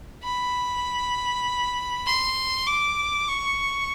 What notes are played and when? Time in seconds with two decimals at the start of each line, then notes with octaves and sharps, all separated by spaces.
0.23 B5
2.06 C6
2.67 D6
3.28 C#6